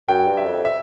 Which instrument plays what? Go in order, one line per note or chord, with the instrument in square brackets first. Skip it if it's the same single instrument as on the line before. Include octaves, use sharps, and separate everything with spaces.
[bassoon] F#2 [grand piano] G5
[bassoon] G2
[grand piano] E5
[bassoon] F2
[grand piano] E5